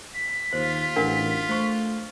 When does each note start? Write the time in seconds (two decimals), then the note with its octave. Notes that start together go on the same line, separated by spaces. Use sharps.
0.14 B6
0.53 D#2 F4 C5
0.96 A1 D4 A#4 F#5
1.49 A3 C5 C#6